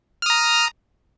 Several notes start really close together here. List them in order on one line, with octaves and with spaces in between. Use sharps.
F6 D#6 A#5